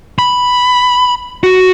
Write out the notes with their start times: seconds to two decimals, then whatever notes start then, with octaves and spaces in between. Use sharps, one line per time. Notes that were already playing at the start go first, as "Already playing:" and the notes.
0.19 B5
1.44 F#4